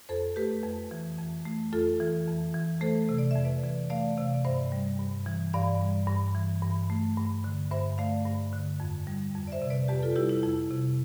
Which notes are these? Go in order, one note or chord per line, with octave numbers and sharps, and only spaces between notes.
F2 A4 C5
A3 G4 B4
F2
E3
F2
A3
F2 F4 A4
E3
F2
E3
A3 A4 C5
C3
D5
F2 E5
B4 D5
E3
A3 D5 F5
C3 D5 F5
D5
G2 C5 E5
G3
G2
E3
G2 D5 F5
G3
G2
E3
G2
A3
G2
D3
G2 C5 E5
A3 D5 F5
G2
D3
F2
G3
F2
D5
C5 E5
C3
B4 D5
F2 G4 B4
F4 A4
G3 E4 G4
E4
F2 E4
C3